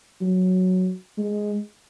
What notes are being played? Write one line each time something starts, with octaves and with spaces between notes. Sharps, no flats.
F#3
G#3